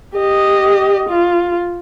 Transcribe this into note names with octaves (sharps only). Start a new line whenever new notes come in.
G4 D#5
F4